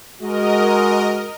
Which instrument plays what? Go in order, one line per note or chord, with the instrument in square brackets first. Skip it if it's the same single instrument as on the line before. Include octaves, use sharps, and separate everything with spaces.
[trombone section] G#3 F#4 [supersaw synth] A#4 D#5